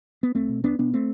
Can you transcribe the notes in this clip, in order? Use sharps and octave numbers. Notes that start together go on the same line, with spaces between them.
B3
C2 A3 C4
B2
C2 B3 D4
B2 B3 D4
A3 C4